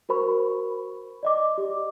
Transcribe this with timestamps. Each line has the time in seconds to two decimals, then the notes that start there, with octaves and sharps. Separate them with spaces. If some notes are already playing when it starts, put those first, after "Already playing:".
0.09 F#4 A#4 C5 B5 C#6
1.23 D5 D#5 D6
1.58 G4